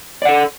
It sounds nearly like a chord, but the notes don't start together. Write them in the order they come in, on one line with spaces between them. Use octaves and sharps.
D5 F#5 A4